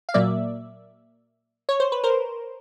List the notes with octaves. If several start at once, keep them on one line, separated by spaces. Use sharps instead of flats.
F5
A#2 F#3 A#3 D5 E5
C#5
C5
B4
A#4 C5